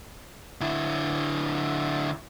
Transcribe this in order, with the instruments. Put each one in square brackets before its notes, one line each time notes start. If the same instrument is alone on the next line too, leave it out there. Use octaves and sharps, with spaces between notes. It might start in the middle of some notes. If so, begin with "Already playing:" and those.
[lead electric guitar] D3 E4